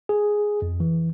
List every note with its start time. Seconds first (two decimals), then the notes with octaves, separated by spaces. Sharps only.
0.09 G#4
0.62 F2
0.80 E3